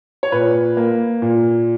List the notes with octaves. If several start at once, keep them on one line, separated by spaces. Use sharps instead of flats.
C#5
A#2 B4
A#3
A#2